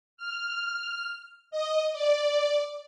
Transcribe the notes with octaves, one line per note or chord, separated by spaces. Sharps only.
F6
D#5
D5